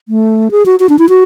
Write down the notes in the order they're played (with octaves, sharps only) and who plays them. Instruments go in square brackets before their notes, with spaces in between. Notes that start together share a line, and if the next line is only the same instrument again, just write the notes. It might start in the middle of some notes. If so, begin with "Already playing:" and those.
[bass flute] A3
G#4
F#4
F#4
D4
E4
F#4